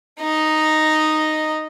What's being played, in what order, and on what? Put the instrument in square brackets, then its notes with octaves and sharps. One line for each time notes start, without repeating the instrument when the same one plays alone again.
[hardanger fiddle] D#4 D#5